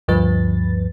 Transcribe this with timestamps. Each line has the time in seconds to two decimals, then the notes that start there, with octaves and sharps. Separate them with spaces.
0.08 D2 G2 F3 B4 A6